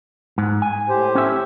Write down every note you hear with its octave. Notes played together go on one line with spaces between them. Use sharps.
G#2
G#5
A2 G4 C5
C#4 E5